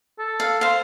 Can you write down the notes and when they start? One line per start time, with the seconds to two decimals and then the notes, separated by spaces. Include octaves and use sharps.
0.19 A4
0.40 F5
0.61 C5 F5